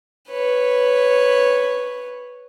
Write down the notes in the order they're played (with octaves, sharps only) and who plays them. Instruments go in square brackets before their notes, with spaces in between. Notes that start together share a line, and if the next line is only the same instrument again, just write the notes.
[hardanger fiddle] B4 C#5